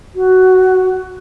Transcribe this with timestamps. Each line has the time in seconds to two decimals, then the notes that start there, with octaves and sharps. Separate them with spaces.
0.15 F#4